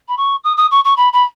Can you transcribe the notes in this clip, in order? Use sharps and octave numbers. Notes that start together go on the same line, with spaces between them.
B5
C#6
D#6
D#6
C#6
C#6
B5
B5